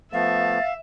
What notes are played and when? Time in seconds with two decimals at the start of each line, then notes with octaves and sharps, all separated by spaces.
0.13 F3 A3 B3 E5 F5 A6